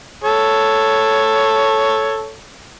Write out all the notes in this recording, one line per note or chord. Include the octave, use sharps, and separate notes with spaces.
A4 C#5